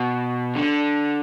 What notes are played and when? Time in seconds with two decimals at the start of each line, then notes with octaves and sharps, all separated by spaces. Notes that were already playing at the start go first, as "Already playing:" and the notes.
Already playing: B2
0.55 D3